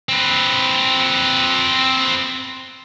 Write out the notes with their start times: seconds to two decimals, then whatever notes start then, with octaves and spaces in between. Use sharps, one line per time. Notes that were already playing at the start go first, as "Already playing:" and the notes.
0.09 C4 B4